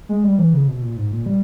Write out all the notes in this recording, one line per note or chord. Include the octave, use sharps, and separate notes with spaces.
G#3
G3
E3
C#3
B2
A#2
G#2
A#2
G3